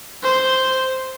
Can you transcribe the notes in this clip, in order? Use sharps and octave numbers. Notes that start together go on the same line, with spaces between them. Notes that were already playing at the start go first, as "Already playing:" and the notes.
C5